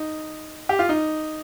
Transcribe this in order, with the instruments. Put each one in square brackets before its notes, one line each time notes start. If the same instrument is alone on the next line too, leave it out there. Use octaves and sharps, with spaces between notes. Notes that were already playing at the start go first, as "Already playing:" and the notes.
Already playing: [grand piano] D#4
G4
F4
D#4